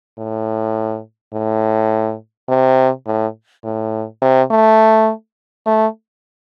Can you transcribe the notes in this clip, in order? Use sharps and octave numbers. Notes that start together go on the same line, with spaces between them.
A2
A2
C3
A2
A2
C3
A3
A3